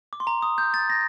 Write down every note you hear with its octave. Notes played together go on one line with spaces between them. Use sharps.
D6
C6
A#5
D#6
G6
A6
A#6